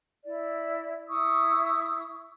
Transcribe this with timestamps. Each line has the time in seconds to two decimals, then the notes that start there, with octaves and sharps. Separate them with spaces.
0.24 E4 D5
1.08 E4 C#6 D#6 E6